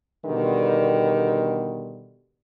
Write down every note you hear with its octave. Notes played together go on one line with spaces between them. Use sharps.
B2 D3 D#3 G3 B3